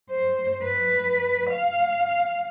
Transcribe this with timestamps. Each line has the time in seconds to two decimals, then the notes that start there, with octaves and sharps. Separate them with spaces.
0.11 C5
0.64 B4
1.50 F5